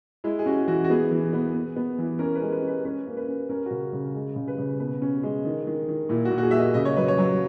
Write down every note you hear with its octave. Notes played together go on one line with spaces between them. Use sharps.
G#3 E4
G#4
C#4 F#4
E3 F#4
F#4
B3 G#4
E3
B3
B3
B3
E3
C#4 A#4
B4
G#3
B4
C#4
B4
C#4 B4
A#3
B4
C#4
C#4 A#4
C#3 F#4
C#3
G#3
C#3
B4
C#3
B2 B4
C#4
G#3
D#3
D#3
D#3
A#2 E4
F#4
A#2
F#4
G#4
A#2 E5
D#5
C#3 D#5
C#5
F#3 B4
C#5
F#3